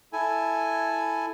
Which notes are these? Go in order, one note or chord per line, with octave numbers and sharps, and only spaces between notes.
E4 A4 G#5